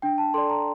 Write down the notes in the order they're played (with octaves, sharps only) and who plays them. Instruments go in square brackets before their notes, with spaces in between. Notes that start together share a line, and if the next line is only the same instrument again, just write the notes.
[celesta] D4 G5
A5
A4 D5 C6
A#5